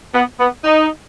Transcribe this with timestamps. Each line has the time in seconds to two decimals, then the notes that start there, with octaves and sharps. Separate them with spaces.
0.14 B3
0.40 B3
0.64 D#4